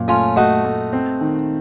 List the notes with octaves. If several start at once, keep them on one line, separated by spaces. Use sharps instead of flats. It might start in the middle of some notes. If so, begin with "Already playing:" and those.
Already playing: F#2 A#2
A3 C#4 F4
A3 D#4 F#4
A3
C4
D#3